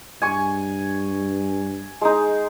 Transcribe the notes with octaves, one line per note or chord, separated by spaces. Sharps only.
G2 G#5 C#6
G#3 D#4